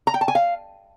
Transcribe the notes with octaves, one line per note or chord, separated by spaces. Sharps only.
A#5
G5
A5
G#5
F5